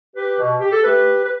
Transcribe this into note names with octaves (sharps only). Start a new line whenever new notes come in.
G4 B4
B2
G4
A4
A3 G4 B4
B4